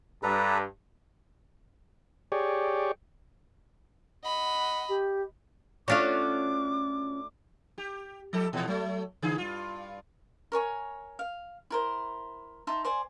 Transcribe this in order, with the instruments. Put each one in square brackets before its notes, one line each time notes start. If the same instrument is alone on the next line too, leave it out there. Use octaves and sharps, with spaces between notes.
[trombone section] G2 [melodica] A4 B4 A#5
[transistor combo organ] G4 G#4 C#5 D5
[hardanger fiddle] D#5 B5 [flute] F#5
[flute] G4
[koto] A3 D4 F#4 [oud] C#4 F4 F5 [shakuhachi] D6
[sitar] G4
F3 G4 A4
A#2 E3 F3
F#3 A3
C#3 E3 G#4
G2 F4
[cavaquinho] A#4 C#5 G#5 C#6
F5
E4 A#4 C5
D#4 E5 A5 C6
C5 D5 G#5